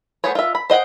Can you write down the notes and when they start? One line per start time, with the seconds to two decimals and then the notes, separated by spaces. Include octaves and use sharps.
0.24 A3 B3 G#4 C5 C#5
0.35 F4 E5
0.55 B5
0.70 C5 D#5 F#5 G5